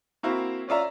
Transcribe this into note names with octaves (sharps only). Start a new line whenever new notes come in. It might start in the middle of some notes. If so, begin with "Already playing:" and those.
A#3 C4 E4 F#4
C#4 F4 D5 E5 A#5